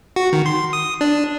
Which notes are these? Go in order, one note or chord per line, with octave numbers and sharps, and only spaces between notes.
F#4
D#3
C6
D#6
D4